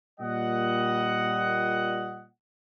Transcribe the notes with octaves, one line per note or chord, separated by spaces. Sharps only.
A#2 G3 D#5 F#5